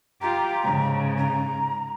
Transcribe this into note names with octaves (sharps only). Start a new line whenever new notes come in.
F4 G4 A#5
G#2 C#3
A#5